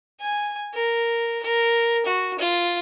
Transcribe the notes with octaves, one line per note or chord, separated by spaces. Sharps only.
G#5
A#4
A#4
F#4
F4